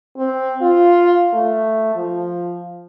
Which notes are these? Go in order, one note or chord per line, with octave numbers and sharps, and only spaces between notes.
C4
F4
A3
F3